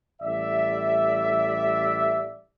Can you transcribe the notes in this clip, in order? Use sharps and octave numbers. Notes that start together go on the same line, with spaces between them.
A1 G3 D5 E5